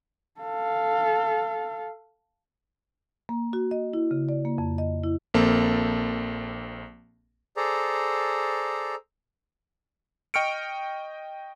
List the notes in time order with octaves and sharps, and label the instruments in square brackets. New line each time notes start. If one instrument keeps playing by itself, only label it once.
[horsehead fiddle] A4 F5
[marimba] A#3
F#4
D#5
E4
C#3
D5
A#3
F2
D#5
E4
[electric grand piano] A#1 A#3 C4 A4 A5
[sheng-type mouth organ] G#4 A4 C5 D5 A#5
[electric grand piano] D#5 G5 C#6 F6 C#7 D7